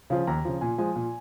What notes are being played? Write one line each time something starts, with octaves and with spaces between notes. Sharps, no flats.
C#3 F3 F5
D#2 A#5
C#3 F3
A#2 G#5
F3 G#3 G#5
A#2